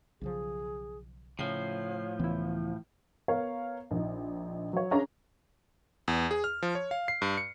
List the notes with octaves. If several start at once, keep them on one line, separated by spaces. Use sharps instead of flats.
B1 C#3 F3 G#4
A2 C#3 F3 C#5 C7
C#2 E3 B3 E4
B3 A#4 C#5 F5
A#1 D#4
F#3 C#5
C#4 D4 G#4 C#5 A#5
E2
G#4
F6
F3
C#5
F5
C7
G2
C#7